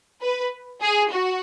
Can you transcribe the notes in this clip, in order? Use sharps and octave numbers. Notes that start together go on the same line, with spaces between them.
B4
G#4
F#4